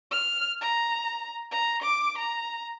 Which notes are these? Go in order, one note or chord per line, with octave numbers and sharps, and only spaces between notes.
F6
A#5
A#5
D6
A#5